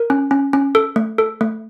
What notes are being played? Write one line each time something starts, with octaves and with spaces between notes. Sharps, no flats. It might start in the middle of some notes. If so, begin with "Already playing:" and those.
Already playing: A#4
C#4
C#4
C#4
A4
A3
A4
A3